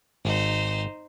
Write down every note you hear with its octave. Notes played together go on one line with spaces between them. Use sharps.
G#1 D#4 C5